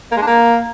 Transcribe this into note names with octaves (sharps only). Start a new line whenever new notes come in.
A#3
G#3
D4
A#3